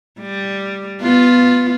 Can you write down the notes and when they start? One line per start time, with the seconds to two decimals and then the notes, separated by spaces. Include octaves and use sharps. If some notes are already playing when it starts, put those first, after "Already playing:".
0.21 G3
1.01 B3 F4